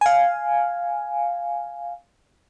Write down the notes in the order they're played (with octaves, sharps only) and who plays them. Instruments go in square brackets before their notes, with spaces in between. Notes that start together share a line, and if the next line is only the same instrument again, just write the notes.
[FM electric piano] F5 G#5